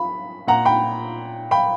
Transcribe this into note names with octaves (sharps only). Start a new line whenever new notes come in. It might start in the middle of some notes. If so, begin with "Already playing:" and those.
Already playing: B5
A#2 F#5 A#5
G5 B5
G5 B5